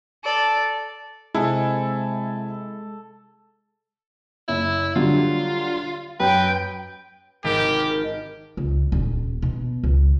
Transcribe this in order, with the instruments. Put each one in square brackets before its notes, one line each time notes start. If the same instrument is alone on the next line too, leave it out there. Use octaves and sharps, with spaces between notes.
[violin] A4 D5
[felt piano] C3 G#5 [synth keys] G#3 [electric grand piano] E4 [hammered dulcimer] A4
[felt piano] F#1 [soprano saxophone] E4
[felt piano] D3 F#3 G3 [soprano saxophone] F4
[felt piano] F#2 [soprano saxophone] B4 [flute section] G5
[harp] G#1 [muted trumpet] G4 [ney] A#4
[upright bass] C#2
D#1
B2
C#2